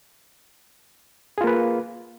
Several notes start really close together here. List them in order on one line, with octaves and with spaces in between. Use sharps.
G#4 F4 A#3 B4